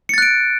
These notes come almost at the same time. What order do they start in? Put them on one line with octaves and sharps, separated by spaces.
C#7 A6 F#6 D7